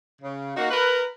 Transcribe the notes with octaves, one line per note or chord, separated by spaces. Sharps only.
C#3
A#3 D#4 F#4
A#4 B4